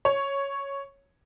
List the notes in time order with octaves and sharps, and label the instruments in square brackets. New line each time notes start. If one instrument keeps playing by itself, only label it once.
[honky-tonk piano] C#5